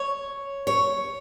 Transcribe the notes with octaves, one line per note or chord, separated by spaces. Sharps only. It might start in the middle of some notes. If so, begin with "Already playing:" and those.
Already playing: C#5
C#5